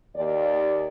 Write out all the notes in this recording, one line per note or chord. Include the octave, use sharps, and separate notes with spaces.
D#2 D5